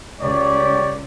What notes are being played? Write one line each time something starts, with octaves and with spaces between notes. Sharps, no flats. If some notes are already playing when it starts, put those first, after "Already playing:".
C#2 G4 C#5 D5